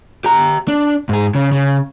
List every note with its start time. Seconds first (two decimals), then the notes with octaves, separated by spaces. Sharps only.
0.24 G4 A#5
0.68 D4
1.09 G#2 G#4
1.35 C#3
1.52 C#3